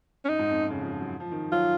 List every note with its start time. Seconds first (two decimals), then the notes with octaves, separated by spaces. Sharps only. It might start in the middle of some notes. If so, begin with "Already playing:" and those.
0.25 C#4
0.29 F#2 D#4
0.39 G#2
0.49 F2
0.60 F#2
0.70 C#3
0.80 F3
0.91 F3
1.01 F#3
1.20 F3
1.32 D#3
1.52 F#3 F4